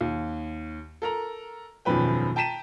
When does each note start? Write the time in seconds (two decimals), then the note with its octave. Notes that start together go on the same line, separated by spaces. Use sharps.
0.01 D#2
1.02 A4 A#4 A#5
1.85 E1 F#2 D#3 F3 B4 G5
2.36 G5 A5 A#5 B6 D#7 E7